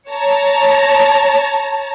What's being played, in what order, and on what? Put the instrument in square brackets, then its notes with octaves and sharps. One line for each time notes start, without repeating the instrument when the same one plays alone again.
[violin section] C#5 A5 A#5